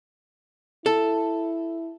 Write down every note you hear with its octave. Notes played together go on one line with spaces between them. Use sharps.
E4 A4